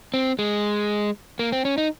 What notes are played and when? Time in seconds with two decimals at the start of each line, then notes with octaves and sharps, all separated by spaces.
0.14 C4
0.39 G#3
1.39 A#3
1.52 C4
1.65 C#4
1.78 D#4